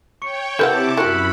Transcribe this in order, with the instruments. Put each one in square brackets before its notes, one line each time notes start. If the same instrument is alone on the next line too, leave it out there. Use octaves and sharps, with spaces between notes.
[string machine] C#5 G5 [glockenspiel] C#6 C#7
[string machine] C3 A5 D6 [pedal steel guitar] E4 G6 [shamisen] A#4 B4 F#5
[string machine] F#2 B5 [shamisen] F#4 A#4 [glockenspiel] C#6 F#6 C#7